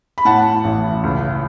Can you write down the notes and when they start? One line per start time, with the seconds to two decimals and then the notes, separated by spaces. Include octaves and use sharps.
0.18 B5
0.25 A2 F#5 A5
0.64 A1
1.03 C#2